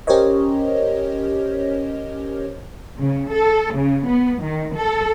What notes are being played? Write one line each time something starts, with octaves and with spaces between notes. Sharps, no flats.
C#4 G4 A#4 C5 C#5 D#5
C#3
A4
C#3
B3
D#3
A4